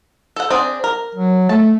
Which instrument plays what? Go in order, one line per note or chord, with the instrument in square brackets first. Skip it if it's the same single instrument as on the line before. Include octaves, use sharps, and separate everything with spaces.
[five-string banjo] A4 F#5
C4 D4 G#4
A#4
[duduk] F#3
[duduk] A3 [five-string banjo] A5